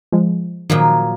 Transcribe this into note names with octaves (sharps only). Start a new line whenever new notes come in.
F3 G#3
A#2 D#3 F3 F#3